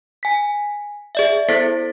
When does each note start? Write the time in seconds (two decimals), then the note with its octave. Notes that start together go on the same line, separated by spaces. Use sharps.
0.23 G#5 B6
1.15 G#4 D5 E5
1.49 B3 E4 A4 C5 A6 B6